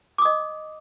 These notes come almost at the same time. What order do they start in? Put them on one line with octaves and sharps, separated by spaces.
D6 D#6 D#5